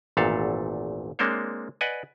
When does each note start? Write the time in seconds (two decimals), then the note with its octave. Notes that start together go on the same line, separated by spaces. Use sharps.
0.17 G#1 E2 A#2 A3 A4 F5
1.19 G#3 A#3 C4 D4 C5 C#5
1.81 B4 D5 D#5 F#5 G#5